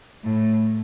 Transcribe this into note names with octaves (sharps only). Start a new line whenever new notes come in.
A2